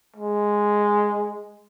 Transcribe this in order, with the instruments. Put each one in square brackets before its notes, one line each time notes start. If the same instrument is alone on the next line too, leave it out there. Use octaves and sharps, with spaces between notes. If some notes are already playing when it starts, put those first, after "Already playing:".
[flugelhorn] G#3